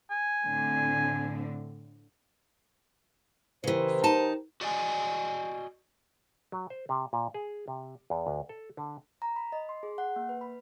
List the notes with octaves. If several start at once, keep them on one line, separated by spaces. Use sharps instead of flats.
G#5
A2 D3 C4
C#3 E3 G4 A#4 C5
D#4 A5
F#4 D5 D#5 G#5
F#3
C5
C3
A#2
G#4
C3
E2
D2
A4
D3
A#5
B5
D#5
C6
G#4
F#5
A#3
B4
B5